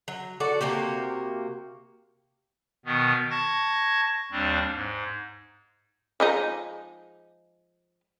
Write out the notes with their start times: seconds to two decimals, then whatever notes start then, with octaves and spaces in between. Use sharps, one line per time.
0.08 F#3
0.40 F#4 A4 D5
0.61 C3 A#3 F#4 G4
2.86 B2 D#3 B3
3.30 A5 C#6 G#6 A#6
4.32 D#2 G3 C4 D4
4.73 G#2
6.20 F3 G#3 D#4